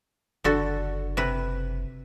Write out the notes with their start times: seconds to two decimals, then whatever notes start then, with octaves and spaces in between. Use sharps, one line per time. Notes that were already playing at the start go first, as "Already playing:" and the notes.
0.44 F#1 D3 F#4 A4
1.17 C3 B4